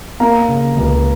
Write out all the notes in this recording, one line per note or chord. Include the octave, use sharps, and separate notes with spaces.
A#3 F5 A#5
C#3
C#2